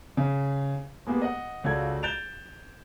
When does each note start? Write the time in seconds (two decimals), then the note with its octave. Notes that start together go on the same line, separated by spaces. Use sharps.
0.17 C#3
1.07 G#3 A#3 B3 G4
1.22 D#5 F#5
1.64 C#2 F4 F#4 A4 D5 G#6
2.03 G6 A6 D7 E7 F7